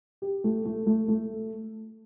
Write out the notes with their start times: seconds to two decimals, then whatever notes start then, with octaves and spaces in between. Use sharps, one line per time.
0.22 G4
0.44 A3
0.65 A3
0.87 A3
1.08 A3